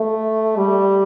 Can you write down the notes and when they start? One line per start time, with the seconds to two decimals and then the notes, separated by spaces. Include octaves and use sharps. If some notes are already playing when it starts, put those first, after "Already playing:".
Already playing: A3
0.57 G3